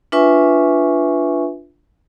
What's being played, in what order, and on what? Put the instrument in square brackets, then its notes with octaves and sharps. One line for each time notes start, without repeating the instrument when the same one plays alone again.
[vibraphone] D4 F4 B4 E5 G#5 C#6